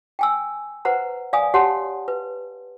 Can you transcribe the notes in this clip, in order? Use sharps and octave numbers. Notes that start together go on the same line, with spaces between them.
G5 G#5 E6
B4 C5 F#5 A#5
D5 F5 G#5 D#6
G4 C#5 F#5 A5 C6
B4